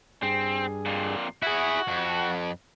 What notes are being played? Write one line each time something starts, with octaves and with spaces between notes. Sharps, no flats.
G2 C4 G#4
F2 A#2
E4 F#4 G#4 F#5
F2